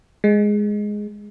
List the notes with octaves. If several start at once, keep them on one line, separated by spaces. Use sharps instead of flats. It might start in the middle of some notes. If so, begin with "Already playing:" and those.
G#3